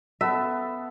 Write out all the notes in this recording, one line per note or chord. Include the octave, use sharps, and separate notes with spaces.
B3 A4 E5